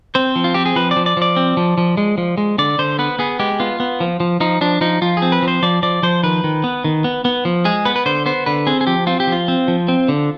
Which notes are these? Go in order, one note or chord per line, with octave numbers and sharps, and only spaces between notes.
C4 C5
F3
F4
C4 G4
G#4
F3 B4
D5
F3
D5
F3 D5
C4
F3
F3
G#3
F3
G#3
D3 D5
D3 C5
B3 B4
B3 G#4
G#3 G4
B3 F4
B3
F3
F3
F3 D#4
F3 D4
F3 D#4
F3 F4
G#4
C4
B4
F3
C5
F3 D5
F3 D5
F3 C5
D#3 B4
D#3
B3
D#3
B3
B3
F3
G#3 G#4
B3 B4
B4
D3 C5
B3 C5
D3 B4
C4 G#4
G#4
F3 G4
C4 F4
G4
F3 F4
C4
F3
C4
D3